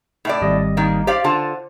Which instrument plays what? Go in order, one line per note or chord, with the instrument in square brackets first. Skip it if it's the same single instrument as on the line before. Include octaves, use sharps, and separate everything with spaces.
[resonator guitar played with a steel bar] A2 E4 D5
[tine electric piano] G#1 G3 D#5
[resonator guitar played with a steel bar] D#3 A#3
[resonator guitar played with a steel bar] G4 D5 F5 [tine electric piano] C5
[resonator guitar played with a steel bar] D3 F4 A5